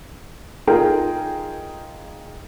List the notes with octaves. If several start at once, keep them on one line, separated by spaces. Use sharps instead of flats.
D#4 F4 G#4 A#4 G5